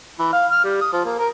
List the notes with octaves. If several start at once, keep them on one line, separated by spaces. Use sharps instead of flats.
E3
F5
F6
G3
D#6
F3
A#3
A#4